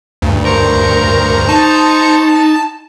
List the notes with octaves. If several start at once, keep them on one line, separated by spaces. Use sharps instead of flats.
D2 G2
A#4 C5 A#5 C#6
D#4 A5